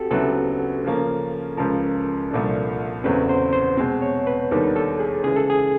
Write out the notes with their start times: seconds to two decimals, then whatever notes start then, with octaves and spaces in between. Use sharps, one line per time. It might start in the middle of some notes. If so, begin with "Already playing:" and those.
Already playing: C4 F#4 G4 A4
0.11 D2 C#3 F#3 B3 E4 A4
0.84 C#3 F3 A#3 C#4
1.57 C#2 C#3 F3 A#4
2.31 C2 A#2 F3 A3 D4
3.04 E2 C#3 F#3 A3 C4 B4
3.29 C5
3.53 C5
3.77 B2 G#3 C4
4.02 C#5
4.27 B4
4.51 D#2 D#3 G3 B3 D4 A4
4.76 A4
5.00 G#4
5.24 C#3 E3 G#3 G#4
5.37 A4
5.50 G#4